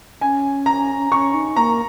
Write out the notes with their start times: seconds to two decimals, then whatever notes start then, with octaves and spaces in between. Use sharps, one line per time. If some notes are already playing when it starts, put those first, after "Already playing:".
0.21 C#4 G#5
0.66 A#5
1.12 C#4 C#6
1.34 D#4
1.56 A#3 A#5